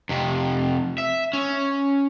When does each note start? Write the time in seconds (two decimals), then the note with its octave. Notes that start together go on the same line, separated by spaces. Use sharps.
0.09 F2 C3
0.98 E5
1.33 C#4